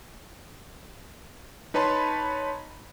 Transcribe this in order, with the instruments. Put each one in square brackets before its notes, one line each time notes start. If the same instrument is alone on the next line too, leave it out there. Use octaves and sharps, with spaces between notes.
[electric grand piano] D#4 B4 C#5 A5 B5 C6